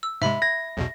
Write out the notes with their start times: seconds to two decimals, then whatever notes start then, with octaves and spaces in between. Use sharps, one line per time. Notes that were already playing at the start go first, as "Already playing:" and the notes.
0.03 E6
0.22 G#2 C3 G#3 E5 B5
0.42 G#6 A#6
0.77 B1 E2 B2